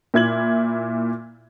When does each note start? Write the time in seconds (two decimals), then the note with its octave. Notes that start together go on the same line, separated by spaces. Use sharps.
0.14 A#2 E4 G#6 F#7